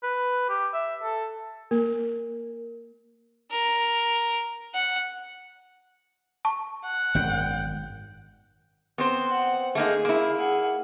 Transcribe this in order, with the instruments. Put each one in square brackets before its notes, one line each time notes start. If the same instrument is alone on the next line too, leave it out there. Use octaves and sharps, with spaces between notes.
[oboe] B4
G4
E5
A4
[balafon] A#3 [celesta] A#4
[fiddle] A#4
F#5
[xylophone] A5 C#6
[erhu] F#5
[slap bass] G#1 F#2 B2 [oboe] G5
[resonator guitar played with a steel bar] B3 C4 C5
[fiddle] F#5
[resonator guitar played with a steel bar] A3 A#3 D#4 [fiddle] G#4
[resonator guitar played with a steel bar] A#3 E4
[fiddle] G#4 F#5